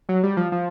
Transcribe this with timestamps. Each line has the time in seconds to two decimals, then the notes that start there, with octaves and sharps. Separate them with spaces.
0.09 F#3
0.23 G3
0.37 F3
0.52 F3